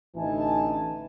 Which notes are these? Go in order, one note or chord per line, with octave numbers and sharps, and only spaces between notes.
A1 D3 E3 D#4 G#5 A5